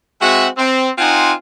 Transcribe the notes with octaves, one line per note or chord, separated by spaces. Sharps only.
G#3 C4 F#4 E5 F#5
C4
C4 D#4 F4 F#5 G#5